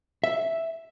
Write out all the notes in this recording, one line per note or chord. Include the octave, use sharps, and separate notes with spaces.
E5